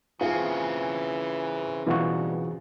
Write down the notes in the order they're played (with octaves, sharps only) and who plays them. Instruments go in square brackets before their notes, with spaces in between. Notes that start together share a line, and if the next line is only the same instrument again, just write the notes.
[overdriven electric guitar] C#3 C4 [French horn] E3 [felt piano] F4 G#4 G#5
[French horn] G2 [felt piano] B2 [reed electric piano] E3 F4 F#4